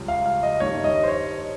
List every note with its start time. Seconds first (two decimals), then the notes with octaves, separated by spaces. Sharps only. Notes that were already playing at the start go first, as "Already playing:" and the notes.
Already playing: C#2 C#3 G3
0.08 F5
0.26 F5
0.43 D#5
0.60 G2 D#3 G3 C#5
0.84 D#5
1.03 C5
1.08 C#5